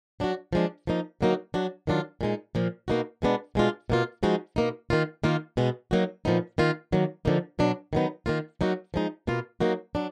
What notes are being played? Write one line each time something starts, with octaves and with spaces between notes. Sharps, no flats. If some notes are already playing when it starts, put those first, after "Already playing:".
F#3 D4 F#4
F3 G#3 D4
F3 A#3 D#4
D3 F#3 A#3 D#4 F#4
F#3 D4 F#4
D#3 F#3 D4 F4
A#2 G#3 D#4
A#2 F3 A#3
B2 A#3 D#4 F#4
B2 G#3 B3 D4
B2 G#3 D4 F4
B2 A#3 F4
F3 G#3 D#4 F#4
B2 A#3 D#4
D#3 A#3 F4
D#3 A#3 F4
B2 G#3 B3
F#3 A#3 D#4 F#4
A#2 F3 B3 D#4
D#3 A#3 F4
D#3 F#3 A#3
D3 F3 A#3 D#4
B2 F#3 D4
D#3 F#3 B3 D#4
D#3 A#3 F4
F#3 A#3 D#4 F#4
F3 G#3 D#4
B2 A#3 F4
F#3 A#3 D#4 F#4
F#3 D4